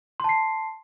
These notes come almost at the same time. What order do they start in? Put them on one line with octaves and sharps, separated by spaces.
C6 A5 C7